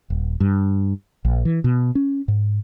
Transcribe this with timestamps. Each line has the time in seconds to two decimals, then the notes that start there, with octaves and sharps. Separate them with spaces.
0.10 D#1
0.40 G2
1.25 A#1
1.45 E3
1.64 B2
1.95 C#4
2.28 G#2